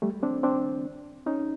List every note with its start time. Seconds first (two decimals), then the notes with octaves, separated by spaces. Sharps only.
0.02 G3 A3
0.23 C4 D4
0.43 C4 D4
1.26 C#4 D#4